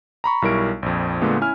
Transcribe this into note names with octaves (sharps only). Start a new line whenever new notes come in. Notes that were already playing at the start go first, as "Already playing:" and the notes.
A#5 B5 C#6
B1 G3 E4 A#4 C#6 D7
A#1 F2
A#2 D3 G#3 A3 B3
C#4 E4 G#5 F6